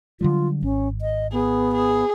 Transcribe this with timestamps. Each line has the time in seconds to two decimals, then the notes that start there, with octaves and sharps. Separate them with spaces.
0.21 D3 F#3 G3 F4
0.63 G#1 C#4
1.01 D#5
1.32 B3 G#4
1.74 G#4